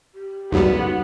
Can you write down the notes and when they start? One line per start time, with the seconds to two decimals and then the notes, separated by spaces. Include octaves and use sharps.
0.14 G4
0.52 C#2 F#2 G3 B3 D#4 F#4